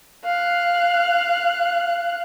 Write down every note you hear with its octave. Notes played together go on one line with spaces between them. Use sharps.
F5 F#6